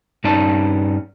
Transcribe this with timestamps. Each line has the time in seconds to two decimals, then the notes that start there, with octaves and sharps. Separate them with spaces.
0.24 G2 C#4 D#4 D5 A5